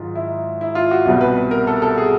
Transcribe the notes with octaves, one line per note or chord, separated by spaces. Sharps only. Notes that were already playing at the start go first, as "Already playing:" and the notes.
Already playing: G#2 D#3 F#3 F4
E4
E4
F4
F#4
C2 B2 G3 F#4
B4
B4
A#4
A4
A4
G#4